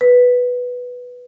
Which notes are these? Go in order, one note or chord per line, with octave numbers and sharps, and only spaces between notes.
B4